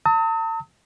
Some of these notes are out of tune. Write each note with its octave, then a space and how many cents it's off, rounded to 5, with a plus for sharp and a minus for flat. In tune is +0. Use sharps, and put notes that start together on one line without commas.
A5 +45 D#6 +40